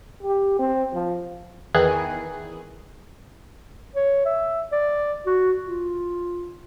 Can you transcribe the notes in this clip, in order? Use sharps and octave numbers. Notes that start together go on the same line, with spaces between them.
G4
C4
F3
E2 D#3 E3 G#4 F#6
C#5
E5
D5
F#4
F4